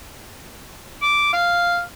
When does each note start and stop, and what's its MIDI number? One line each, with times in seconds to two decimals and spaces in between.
1.02 1.28 86
1.33 1.79 77